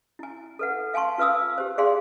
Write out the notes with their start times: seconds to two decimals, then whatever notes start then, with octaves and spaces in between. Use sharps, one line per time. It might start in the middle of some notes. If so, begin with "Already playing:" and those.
0.19 E4 G#5
0.59 A4 B4 F#5
0.94 F5 G#5 A5 C6 C#6
1.18 F4 B4 F5 D#6 E6
1.58 G4 C5
1.78 G#4 D5 F5 G5 G#5 C6